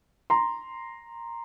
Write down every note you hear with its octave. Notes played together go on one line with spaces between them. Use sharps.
A#5 C6